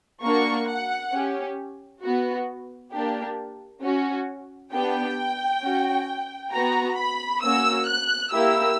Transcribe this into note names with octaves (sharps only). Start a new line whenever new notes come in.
A#3 D4 F#4 C#6
F#5
C#4 G4
B3 F#4
A#3 D4 G4
C#4 F#4
B3 D4 G4 G5
C#4 F#4
B3 F#4 A#5
B5
A#3 C#4 F#4 E6
F#6
A#3 E4 G4 E6